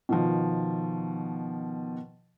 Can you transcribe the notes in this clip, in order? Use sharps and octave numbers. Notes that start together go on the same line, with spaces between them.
B2 D#3 F3